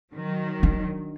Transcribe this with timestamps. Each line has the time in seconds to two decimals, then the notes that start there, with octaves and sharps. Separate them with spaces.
0.14 D#3 F#3
0.63 D4